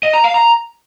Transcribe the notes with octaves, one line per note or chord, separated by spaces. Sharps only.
D#5
A#5
F5
A#5